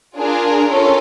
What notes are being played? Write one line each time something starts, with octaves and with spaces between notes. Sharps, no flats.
D4 F4 G#4 A#4
C#4 F4 A4